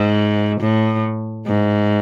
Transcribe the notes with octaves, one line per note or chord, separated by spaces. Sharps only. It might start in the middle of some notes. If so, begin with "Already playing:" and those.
Already playing: G#2
A2
G#2